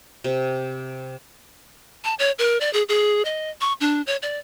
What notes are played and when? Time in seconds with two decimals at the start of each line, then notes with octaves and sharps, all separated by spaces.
0.24 C3
2.04 A5
2.19 C#5
2.39 A#4
2.61 D5
2.73 G#4
2.89 G#4
3.25 D#5
3.61 C#6
3.81 D4
4.07 C#5
4.23 D5